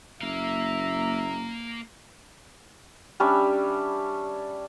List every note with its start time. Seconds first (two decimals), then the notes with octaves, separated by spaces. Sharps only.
0.21 F#1 A#3 E5 F5 A#5
3.20 G3 C#4 D4 E5